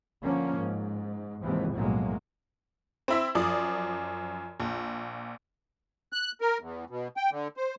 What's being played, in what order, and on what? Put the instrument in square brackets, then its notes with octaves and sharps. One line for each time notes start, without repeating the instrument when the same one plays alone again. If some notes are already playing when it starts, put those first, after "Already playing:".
[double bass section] D3 F3 A#3 C#4
G#2
D#2 G#2 C3 E3 F3
B1 F#2 A2 F#3 G#3 A#3
[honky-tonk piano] C4 E4 E5
F#2 F3 D5 D#6
A#1
[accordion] F#6
A#4
E2
B2
G5
D3
C5